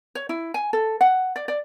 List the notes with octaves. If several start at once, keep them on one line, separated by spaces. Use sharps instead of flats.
C#5
E4
G#5
A4
F#5
D5
D5